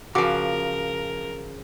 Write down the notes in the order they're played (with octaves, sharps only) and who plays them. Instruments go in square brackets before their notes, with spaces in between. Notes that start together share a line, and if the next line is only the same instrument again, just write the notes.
[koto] C#3 F3 [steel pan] F#4 F#5 D6 [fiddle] A#4